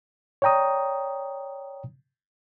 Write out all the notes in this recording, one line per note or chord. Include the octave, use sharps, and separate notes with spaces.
C#5 D5 G5 A#5 D#6